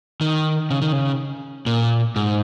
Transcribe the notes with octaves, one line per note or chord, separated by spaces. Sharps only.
D#3
C#3
D#3
C#3
A#2
G#2